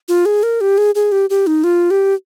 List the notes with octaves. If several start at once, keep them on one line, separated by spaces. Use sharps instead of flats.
F4
G#4
A#4
G4
G#4
G#4
G4
G4
D#4
F4
G4